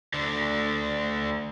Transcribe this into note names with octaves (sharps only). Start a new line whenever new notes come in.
D2 D3